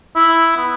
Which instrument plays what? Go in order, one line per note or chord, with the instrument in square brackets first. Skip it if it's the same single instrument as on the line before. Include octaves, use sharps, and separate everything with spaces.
[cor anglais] E4
B3